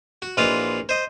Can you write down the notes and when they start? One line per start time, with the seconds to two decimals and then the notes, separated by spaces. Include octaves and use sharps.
0.22 F#4
0.37 A#1 E3 F4 F#4 D#5 F5
0.89 C5 D#5